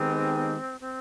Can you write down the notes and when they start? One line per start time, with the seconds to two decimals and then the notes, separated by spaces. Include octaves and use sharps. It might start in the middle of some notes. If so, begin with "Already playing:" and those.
Already playing: D#3 G#3 B3 C4 D#4 G4
0.81 C4